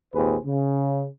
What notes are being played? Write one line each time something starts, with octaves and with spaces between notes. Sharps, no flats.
G#1 D#2 A#2 G#4 B4 C5
C#3